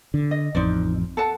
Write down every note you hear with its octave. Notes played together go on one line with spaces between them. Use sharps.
D3
D#5
A1 F2 D#4 C5 D5
A4 F#5 A5